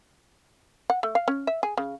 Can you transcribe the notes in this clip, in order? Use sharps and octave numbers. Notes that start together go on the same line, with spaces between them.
F#5
A3
F5
C#4
E5
G#4
C#3